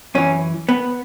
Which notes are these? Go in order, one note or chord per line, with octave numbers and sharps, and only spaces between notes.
F#2 E3 C#4
B3